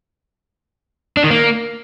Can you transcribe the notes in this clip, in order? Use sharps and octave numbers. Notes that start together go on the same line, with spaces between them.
D4
D#3
A#3